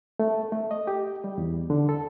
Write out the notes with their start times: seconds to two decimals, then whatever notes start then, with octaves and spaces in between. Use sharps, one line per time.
0.19 A3
0.52 A3
0.71 D#5
0.87 G4
1.24 G3
1.38 E2
1.70 D3
1.89 A4